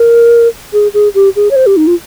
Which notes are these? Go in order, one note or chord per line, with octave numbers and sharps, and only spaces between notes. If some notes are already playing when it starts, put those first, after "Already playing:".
Already playing: A#4
G#4
G#4
G4
G#4
C#5
C5
G4
D#4
F4